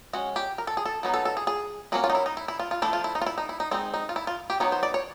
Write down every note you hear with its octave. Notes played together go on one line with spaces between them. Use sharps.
G#3 C#4 F#4
G4
A#4
A4
G#4
A4
F#3 B3 D#4
A4
A4
G#4
G#4
F#3 A#3 C#4 F#4
F4
D#4
E4
D#4
E4
E4
F4
F4
F3 A3 D4 E4
F4
E4
D#4
F4
E4
D#4
E4
D#4
G#3 C4 D#4 E4
D#4
F4
E4
F4
G4
F#3 B3 D#4 C#5
C5
D5
C#5